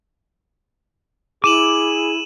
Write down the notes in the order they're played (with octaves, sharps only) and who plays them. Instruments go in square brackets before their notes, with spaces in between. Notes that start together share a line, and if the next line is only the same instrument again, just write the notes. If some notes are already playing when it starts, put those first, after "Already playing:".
[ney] E4 [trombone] G#4 [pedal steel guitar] D6 [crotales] D#7 E7 F#7